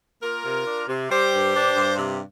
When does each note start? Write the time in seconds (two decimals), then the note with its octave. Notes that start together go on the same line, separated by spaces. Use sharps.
0.22 A#3 F4 A#4
0.44 C3
0.67 D4
0.87 C3
1.10 G3 G4 C5
1.32 G2
1.54 D4
1.76 G2
1.97 C3